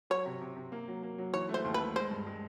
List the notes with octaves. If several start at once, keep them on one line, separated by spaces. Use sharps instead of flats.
F#3 C#5
C3
C3
C3
A#3
F#3
A#3
F#3
E3 C#5
A3
C5
D#2
B4
A3
G#3 C5
G2
G#3